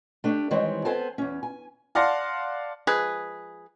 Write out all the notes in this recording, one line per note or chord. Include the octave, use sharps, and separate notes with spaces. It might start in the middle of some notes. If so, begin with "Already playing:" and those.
A3 D4 G4
D#3 E3 G3 G#3 C4 C#5
B3 C4 A4 C5 G#5 A5
E2 C#4
G#5
D5 F5 F#5 A5 C6 A#6
F3 G#3 G#4 B4